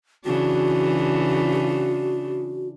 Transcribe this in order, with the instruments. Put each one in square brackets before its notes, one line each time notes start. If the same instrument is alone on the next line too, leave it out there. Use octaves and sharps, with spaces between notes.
[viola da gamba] C#3 E3 D4 [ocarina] F#4